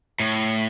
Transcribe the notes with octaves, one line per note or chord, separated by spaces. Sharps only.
A2